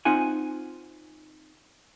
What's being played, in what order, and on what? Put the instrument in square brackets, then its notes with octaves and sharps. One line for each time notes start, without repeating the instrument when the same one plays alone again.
[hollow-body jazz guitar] C4 D#4 F4 F#5 G#5